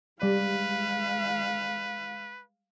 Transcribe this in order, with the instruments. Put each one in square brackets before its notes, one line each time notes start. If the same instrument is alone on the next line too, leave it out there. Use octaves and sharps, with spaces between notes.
[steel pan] G3 D5 [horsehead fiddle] G#3 F5 [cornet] B4